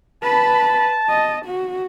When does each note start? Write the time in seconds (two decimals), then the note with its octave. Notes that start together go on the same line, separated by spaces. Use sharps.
0.23 B4 A5 B5
1.09 D#5
1.46 F#4